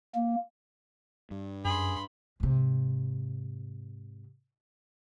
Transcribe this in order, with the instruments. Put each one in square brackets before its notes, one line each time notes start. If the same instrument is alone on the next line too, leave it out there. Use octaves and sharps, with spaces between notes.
[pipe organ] A#3
[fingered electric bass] G2
[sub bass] F#2 [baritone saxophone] G#4 [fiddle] B5 C6
[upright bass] G#2 C3